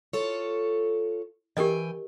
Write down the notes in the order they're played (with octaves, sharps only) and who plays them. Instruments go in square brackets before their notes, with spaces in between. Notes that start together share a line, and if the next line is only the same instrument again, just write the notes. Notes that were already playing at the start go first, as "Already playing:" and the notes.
[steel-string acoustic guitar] F4 A4 C#5
[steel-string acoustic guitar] E3 G5 G#5 [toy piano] G4 A#4 D#5